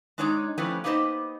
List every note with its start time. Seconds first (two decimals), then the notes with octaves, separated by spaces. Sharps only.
0.18 G#3 D4 D#4 C#5 G5 A#5
0.58 F3 G3 A3 C#4 E4 B4
0.84 A#3 B3 D#4 G4 C5 D#5